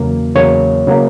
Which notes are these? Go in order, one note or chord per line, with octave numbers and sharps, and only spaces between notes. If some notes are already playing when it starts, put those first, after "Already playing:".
Already playing: E2 C#3 F#3 A#3
E2 C#3 F#3 A#3 C#5
C#3 F#3 A#3